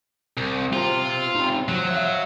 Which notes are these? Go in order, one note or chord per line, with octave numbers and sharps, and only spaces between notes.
C2
F4 G4 C5
C4 D#4
F3 F#3
E5 F5